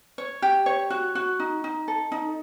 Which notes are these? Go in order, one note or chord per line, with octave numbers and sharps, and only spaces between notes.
C#5
G4
C#5
F#4
F#4
D#4
D#4
A4
D#4